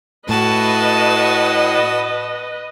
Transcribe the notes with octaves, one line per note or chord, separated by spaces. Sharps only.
A2 F#4 B4 D#5 A5